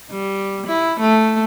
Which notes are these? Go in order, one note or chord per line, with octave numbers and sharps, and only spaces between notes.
G3
E4
A3